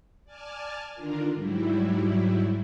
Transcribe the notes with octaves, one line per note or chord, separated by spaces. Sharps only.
D5 G#5 A5 F6
D3 D#3 D4 F4 A#4
G#2 F#3 G3 E4